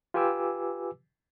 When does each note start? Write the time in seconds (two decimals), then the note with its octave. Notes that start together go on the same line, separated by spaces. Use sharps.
0.14 F4 G4 B4 G#5 D6 E6